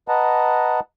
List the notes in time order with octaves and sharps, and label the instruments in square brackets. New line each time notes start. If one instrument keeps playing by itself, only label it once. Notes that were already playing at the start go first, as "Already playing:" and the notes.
[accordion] B4 D#5 F#5 A5 A#5